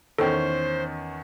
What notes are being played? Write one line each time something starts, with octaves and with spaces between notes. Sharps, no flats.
E2 D#3 C#4 A4 C5 G5